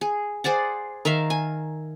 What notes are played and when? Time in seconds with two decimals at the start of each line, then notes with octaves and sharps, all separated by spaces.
0.01 G#4
0.44 G#4 C5 D5 F#5
1.05 D#3 A#4 E5 F5
1.30 G#5